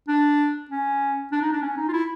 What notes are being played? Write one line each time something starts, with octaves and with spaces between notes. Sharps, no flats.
D4
C#4
D4
D#4
D4
C#4
D#4
F4
E4